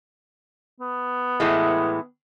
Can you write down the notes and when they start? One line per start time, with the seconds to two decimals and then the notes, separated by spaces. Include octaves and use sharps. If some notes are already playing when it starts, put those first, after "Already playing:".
0.80 B3
1.40 A2 E3 G#3